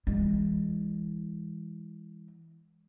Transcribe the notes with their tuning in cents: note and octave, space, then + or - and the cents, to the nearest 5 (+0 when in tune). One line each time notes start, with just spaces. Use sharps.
E3 -5 G#3 -35